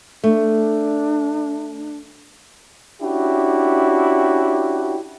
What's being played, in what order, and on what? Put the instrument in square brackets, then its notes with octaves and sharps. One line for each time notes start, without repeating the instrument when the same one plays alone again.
[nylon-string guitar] A3 [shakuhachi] D4
[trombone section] C#4 D4 E4 F#4 G4